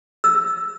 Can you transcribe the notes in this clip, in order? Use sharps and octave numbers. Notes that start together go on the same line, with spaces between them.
E6